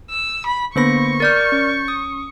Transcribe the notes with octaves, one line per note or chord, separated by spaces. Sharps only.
E6
B5
D3 A#3 B3 C5 B5 C#6 A#6
A#4 D5 F6 G6 A6
C#4
D#6